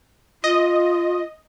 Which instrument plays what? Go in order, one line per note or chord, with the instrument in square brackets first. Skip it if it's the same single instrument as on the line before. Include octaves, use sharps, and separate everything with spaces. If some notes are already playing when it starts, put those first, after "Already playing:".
[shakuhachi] F4 [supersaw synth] D#5